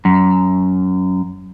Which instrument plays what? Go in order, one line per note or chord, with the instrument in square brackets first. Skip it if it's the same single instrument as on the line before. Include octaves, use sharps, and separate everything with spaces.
[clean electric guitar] F#2